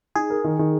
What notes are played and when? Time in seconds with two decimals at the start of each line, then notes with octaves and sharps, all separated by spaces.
0.16 D#4 G#4
0.30 A#4
0.44 D#3
0.59 D#3